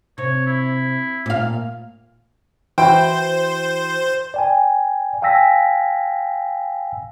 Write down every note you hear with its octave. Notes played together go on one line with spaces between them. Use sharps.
C3 C#5
E4
A#2 F5
E3 E4 F#4 C5 G5
D5 G5 G#5
F5 G5 G#5 E6 A#6 B6